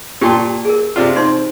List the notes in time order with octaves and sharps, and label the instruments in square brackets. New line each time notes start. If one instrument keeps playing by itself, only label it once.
[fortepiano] A#2 C6 [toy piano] G4 G5 A5
[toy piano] G#4 A#4
[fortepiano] C3 D4 F4
[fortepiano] C4 [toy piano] D#4 C6